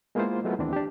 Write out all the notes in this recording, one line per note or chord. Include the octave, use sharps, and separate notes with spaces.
G#3 A#3 B3 E4 F4 C5
F#3 G#3 A3 B3 E4 F4
D#2 E3 C4 D4
D4 G4